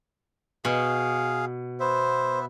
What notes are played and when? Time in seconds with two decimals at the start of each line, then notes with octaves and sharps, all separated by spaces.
0.65 B2 G#4 F5
1.80 B3 C5 E5